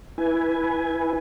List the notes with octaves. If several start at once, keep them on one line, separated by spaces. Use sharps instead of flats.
E4 B4 G#5